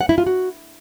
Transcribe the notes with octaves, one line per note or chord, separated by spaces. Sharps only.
F#5
E4
F4
F#4